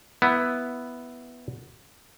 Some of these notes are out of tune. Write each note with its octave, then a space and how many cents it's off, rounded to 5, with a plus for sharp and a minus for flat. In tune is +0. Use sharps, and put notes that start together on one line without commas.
B3 +0 E4 +0